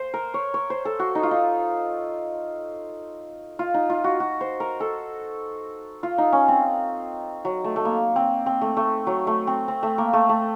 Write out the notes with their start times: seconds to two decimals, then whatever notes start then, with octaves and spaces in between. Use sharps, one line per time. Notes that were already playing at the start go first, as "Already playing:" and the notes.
Already playing: C5
0.14 A#4
0.34 C#5
0.54 C#5
0.70 C5
0.85 A4
0.99 F#4
1.15 D#4
1.23 F4
1.31 D#4
3.59 F4
3.74 D#4
3.90 F4
4.04 F#4
4.20 F#4
4.41 C5
4.60 A#4
4.80 A4
6.03 F4
6.18 D#4
6.32 C#4
6.48 C4
7.45 F#3
7.64 A3
7.76 A3
7.85 A#3
8.16 C4
8.46 C4
8.61 A3
8.77 A3
9.07 F#3
9.27 A3
9.47 C4
9.68 C4
9.83 A3
9.98 A#3
10.13 A3
10.29 A3